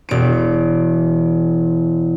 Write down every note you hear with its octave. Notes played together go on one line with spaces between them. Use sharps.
E1 D7